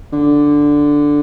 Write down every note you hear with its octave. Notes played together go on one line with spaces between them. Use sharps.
D3